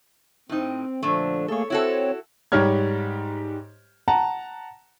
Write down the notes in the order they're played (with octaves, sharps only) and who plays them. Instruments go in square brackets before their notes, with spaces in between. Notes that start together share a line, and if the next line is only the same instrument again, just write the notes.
[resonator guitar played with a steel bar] A2 D#4 [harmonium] C4
[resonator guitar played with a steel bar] A#2 A3 [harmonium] D3 F3 D4
[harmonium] A3 A#3 G#4 [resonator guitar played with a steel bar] A4 C#5
[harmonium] C4 C#5 [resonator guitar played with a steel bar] E4 F#4 A4
[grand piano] G#2 G3 G4 C#5 F6 G#6
F#5 A5 A#5